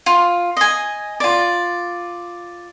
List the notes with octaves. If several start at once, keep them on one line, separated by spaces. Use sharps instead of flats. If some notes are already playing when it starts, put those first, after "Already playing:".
F4
D#5 G#5
F4 D5